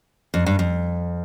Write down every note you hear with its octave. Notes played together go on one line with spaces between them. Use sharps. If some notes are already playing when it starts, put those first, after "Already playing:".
F2
G2
F2